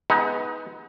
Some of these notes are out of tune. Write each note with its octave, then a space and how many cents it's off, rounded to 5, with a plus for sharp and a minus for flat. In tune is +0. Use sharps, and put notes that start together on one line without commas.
G#3 +0 B3 +0 D#4 +30